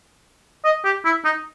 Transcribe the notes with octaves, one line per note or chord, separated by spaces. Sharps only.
D#5
G4
E4
D#4